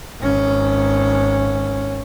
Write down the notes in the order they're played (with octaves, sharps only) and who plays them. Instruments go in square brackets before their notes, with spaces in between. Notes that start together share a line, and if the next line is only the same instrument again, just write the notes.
[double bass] G#1 C#4